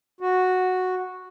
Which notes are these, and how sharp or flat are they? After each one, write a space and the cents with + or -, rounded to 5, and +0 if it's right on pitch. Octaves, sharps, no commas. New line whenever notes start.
F#4 -5